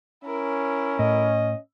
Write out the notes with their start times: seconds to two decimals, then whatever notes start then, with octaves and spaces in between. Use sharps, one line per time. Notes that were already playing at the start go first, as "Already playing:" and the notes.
0.25 C#4 E4 A#4
0.99 A2 D#5